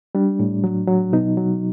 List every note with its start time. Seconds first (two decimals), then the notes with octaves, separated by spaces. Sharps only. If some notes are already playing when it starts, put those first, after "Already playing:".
0.15 G3 D4
0.39 A2
0.64 F#3
0.88 F#3
1.13 B2 D#4
1.37 F#3